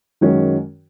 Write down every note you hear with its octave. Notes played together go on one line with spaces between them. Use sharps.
F#2 D#3 G#3 C#4 F#4